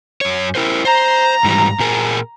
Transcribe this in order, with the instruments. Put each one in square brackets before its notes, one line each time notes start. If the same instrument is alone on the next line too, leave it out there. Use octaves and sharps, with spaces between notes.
[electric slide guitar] F#2 C#5
E4 A#4 C5
[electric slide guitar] C5 [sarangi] A#5
[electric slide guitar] G#2 E3 G3
A#2 G#4 A#4